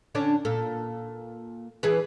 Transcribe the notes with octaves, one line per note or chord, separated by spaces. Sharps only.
D3 C#4 D4
A#2 A4
E3 G#4 B4